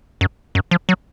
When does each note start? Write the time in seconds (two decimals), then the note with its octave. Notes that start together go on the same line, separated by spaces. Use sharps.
0.21 F#2
0.55 F#2
0.71 F3
0.89 F#3